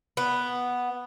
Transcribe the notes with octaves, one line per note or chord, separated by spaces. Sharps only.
B3